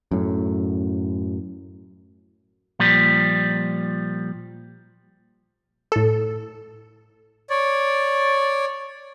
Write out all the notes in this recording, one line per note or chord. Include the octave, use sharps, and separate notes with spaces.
F#2 A2
A#2 F3 G3
A2 A4
C#5 D5